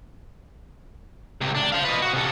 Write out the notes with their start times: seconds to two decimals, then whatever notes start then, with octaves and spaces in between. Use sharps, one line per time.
1.41 C#2 C3
1.55 D4
1.72 C5 F5
1.85 B4 D#5
2.02 F#4
2.13 C3 A4